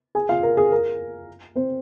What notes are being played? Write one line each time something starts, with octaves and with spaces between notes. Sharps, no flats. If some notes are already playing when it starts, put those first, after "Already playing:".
G#4 G#5
F4 F5
A#4
G#4
A#4
C4 C5